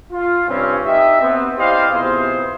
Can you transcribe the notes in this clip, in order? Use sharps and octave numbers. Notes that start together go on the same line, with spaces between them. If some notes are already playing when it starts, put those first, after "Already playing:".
F4
G2 C3 C4 C#4
D#4 G4 D#5 E5
B3 C4
E4 G4 C5 D5 D#5 F5
C3 B3 E4 F4 G#4 C5